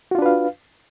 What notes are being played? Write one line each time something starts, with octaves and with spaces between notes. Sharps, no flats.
D4 F4 F#4 B4 F5